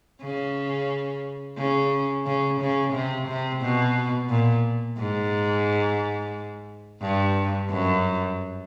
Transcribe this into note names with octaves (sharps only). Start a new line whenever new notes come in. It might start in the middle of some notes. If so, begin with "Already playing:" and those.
C#3
C#3
C#3
C#3
C3
C3
B2
A#2
G#2
G2
F#2